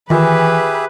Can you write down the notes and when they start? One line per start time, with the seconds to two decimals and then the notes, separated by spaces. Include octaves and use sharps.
0.10 D#3 E3 F4 G4 G#4 B4 E5